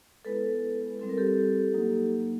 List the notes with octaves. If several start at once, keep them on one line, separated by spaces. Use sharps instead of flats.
G#3 B3 E4 A4 B4
G3 C4 E4 A4
A#4
G4 A4
F#3 A#3 D#4